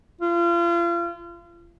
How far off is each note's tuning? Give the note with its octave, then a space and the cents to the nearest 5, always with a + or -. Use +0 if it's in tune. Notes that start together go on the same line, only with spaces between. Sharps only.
F4 -35